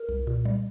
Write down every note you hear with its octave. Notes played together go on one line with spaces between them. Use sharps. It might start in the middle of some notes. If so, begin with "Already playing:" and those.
Already playing: A#4
C2
A#2
G3